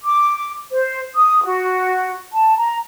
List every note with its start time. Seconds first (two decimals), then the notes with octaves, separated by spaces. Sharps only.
0.04 D6
0.72 C5
1.16 D#6
1.44 F#4
2.33 A5
2.58 A#5